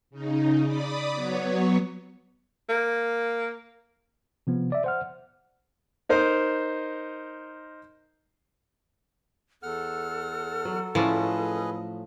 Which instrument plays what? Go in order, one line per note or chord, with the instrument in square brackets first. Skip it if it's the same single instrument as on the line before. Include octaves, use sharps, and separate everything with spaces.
[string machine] C#3 D#4
D5 B5 D6 D#6
F#3 B3 C#5
[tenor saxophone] A#3
[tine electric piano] C3 F3 B3
D5 E5
C5 F#5 F6
[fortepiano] D#4 A#4 C5 D#5
[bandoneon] E2 F#5 F6 [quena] A4
[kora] F#3
[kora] A2 C#4 D5 [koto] F3 [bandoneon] G#4 B4 D#5